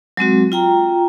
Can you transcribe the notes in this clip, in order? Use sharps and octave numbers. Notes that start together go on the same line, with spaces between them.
F#3 G#3 C4 F#4
F4 G5 A#5